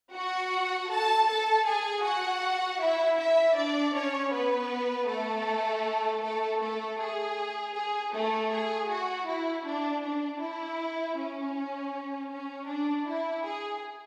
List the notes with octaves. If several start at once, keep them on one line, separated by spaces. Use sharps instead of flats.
F#4 F#5
A4 A5
A4 A5
G#4 G#5
F#4 F#5
E4 E5
E4 E5
D4 D5
C#4 C#5
B3 B4
A3 A4
A3 A4
A3 A4
G#4
G#4
A3 A4
G#4
F#4
E4
D4
D4
E4
C#4
C#4
D4
E4
G#4